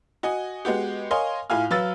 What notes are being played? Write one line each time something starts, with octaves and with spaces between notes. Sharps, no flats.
F#4 D#5 G#5
G#3 B3 F#4 G4
A#4 C#5 D#5 F5 G#5 C6
A2 F4 F5 G#5 F6
F#3 B4 F5 E6 A6